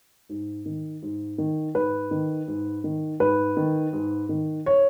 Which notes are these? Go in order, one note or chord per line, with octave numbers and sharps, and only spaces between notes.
G#2
D#3
G#2
D#3
G#2 B4
D#3
G#2
D#3
G#2 B4
D#3
G#2
D#3
C#5